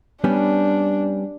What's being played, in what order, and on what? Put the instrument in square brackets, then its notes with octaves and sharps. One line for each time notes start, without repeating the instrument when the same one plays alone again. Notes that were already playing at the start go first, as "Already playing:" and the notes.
[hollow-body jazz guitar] G3 B3 C#4 [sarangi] D4